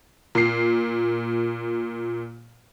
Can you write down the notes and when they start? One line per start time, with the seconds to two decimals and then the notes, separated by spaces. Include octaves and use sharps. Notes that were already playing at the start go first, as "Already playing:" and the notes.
0.35 A#2 C7